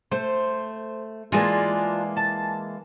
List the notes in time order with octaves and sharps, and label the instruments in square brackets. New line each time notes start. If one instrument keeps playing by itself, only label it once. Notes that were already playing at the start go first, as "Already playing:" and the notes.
[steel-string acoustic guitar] A3 [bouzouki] C5
[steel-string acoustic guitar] E3 G#3 A#3 [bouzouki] D4 F4
[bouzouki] A5